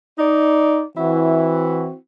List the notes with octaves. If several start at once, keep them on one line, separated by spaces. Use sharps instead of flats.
D#4 D5
E3 C4 E4 F#4